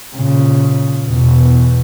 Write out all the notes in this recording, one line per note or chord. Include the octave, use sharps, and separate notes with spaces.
A#2 C#3
E2 B2